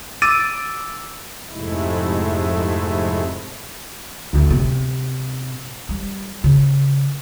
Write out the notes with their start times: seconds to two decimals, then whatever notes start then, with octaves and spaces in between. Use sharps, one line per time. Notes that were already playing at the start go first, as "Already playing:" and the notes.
0.22 D6 E6 A6 D7 D#7
1.50 F2 G#2 C3 G#3 A3 E4
4.33 D2
4.50 C3
5.89 G3
6.44 C#3